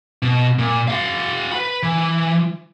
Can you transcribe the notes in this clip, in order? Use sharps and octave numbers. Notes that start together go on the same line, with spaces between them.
B2
A#2
F#4 F5
B4 B5
E3